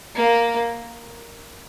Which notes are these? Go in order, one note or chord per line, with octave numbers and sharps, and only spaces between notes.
A#3